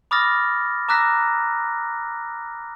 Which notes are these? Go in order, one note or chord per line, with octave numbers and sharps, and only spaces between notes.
B5 D6 D#6 F6 A6 A#6
A#5 D6 E6 F#6 A#6 B6